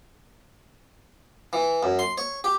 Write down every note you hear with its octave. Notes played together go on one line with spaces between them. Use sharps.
E3
F#2
C6
C#5
G4